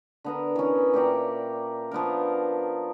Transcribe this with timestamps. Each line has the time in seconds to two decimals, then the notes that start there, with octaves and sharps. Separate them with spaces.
0.24 D3 B3 A#4
0.56 E3 C#4
0.94 A#2 G4 D5 A#5
1.91 F3 B3 D4 A#4